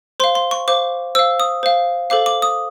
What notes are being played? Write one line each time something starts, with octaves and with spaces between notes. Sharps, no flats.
C5 F5 C6
C6
C#6
C5 F5 D6
C5 F5 E6
D#6
C5 F5
A4 C5 F5 D6
D6
D#6